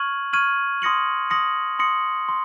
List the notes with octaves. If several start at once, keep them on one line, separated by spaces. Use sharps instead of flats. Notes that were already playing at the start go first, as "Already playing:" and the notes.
Already playing: C#6 F6 G#6 D#7 F#7
C#6 F6 G#6 D#7 F#7
C6 D#6 A#6 C#7 F#7
C6 D#6 A#6 C#7 F#7
C6 D#6 A#6 C#7 F#7
C6